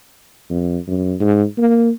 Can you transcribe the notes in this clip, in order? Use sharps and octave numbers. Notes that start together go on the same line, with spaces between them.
F2
F#2
G#2
A#3